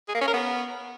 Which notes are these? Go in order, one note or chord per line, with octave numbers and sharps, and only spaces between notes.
G#4
A#3
C#4
A#4
B3